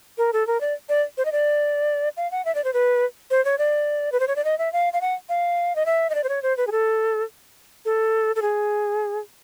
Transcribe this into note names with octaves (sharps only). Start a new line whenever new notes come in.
A#4
A4
A#4
D5
D5
C5
D#5
D5
F5
F#5
E5
D5
C5
B4
C5
C#5
D5
B4
C5
C#5
D5
D#5
E5
F5
F5
F#5
F5
D#5
E5
D#5
D5
C5
C#5
C5
B4
G#4
A4
A4
A4
G#4